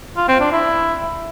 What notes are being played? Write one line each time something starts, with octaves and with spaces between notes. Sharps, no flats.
F4
C4
D4
E4